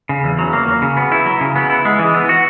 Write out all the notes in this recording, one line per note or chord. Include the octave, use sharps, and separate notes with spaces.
C#3
E2
F#3
A#3
F#3
C#3
B3
E4
F#3
C#3
B3
E4
G#3
E3
B3
F#4